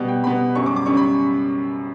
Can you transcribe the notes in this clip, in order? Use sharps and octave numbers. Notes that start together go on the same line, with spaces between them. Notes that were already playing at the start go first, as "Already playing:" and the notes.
Already playing: B2 G3 B3
G5
B2 G3 B3 B5
F#2 C#3 G3 C#4 C#6
D6
D6
C#3 G3 C#4 C#6
B5